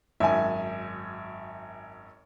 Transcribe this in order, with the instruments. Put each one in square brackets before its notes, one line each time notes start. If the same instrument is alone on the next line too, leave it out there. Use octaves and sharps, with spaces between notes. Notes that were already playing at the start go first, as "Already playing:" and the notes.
[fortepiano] G#1 F#2 [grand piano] E5 G#5